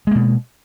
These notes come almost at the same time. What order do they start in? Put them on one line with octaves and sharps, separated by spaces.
G#3 A#3 B2